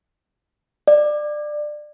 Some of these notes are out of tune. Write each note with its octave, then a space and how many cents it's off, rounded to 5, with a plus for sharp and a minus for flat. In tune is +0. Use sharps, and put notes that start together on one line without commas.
D5 +25